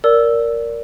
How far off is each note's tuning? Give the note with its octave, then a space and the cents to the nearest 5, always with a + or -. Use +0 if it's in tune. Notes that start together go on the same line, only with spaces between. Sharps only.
A#4 +0 D5 -15 E6 +0